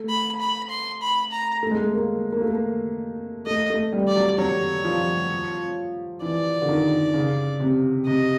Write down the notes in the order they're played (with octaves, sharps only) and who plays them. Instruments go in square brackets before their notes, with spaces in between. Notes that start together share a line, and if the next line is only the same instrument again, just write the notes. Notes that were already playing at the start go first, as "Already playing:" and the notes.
Already playing: [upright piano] A3
[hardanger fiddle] B5
B5
C6
B5
A#5
[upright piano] A3
G#3
A3
A#3
A#3
A3
A#3
[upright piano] A3 [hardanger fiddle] D#5
[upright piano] A3
G3
[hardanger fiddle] D5
[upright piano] F#3
[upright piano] F#3 [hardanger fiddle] C#5
[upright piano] F3
[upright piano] E3 [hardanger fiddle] D5
[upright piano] D3
D#3
C#3
C3
[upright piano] C3 [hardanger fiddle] D#5